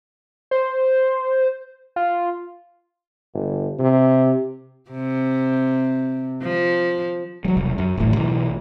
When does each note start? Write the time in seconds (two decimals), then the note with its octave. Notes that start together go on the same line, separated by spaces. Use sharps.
0.51 C5
1.96 F4
3.34 G1
3.79 C3
4.91 C3
6.43 F3
7.45 F#3 G3
7.57 E1 C2
7.78 F#2
7.97 D#1 A1 A2 E3
8.16 B1 E3